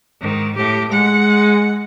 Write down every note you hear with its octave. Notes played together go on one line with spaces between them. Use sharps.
G#2 D#3
A2 G4
G#3 F#5